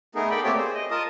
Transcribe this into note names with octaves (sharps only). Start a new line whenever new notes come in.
A3 B3 D#4 G#4 A#4
B3 A4 D5 G5 B5
A3 A#3 C4 G4 C#5 D5
G#4 C5
D#5
F4 A#4 D#5 A5 D#6